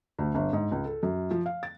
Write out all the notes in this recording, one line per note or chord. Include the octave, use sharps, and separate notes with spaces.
D2
G1
G#2
C#2
A4
F#2
F3
F5
A6